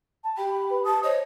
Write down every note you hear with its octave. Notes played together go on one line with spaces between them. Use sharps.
A5
G4 G5 B5
B4
A5 D#6
C5 C#5 D#5